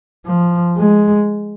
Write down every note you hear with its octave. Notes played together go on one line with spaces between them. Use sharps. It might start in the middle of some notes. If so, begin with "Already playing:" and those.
F3
G#3